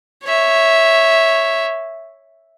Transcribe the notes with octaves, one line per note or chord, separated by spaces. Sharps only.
C#5 E5